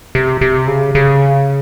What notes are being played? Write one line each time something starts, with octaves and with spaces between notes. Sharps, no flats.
C3
C3
C#3
C#3